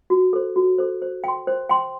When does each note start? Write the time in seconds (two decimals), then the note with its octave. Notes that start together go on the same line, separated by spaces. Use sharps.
0.10 F#4
0.33 A4 C5
0.56 F#4
0.78 A4 C5
1.02 C5
1.24 G5 C6
1.47 C5
1.69 G5 C6